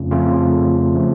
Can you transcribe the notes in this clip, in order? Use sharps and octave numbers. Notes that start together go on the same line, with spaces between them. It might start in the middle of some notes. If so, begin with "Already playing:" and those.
Already playing: F2 C#3 A3 C#4 F4
F2 C#3 A3 C#4 F4
C#3 F3 A3